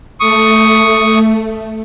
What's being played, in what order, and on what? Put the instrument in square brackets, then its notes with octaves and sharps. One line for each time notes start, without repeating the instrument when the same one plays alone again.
[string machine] A3 [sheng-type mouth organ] C#6 D#6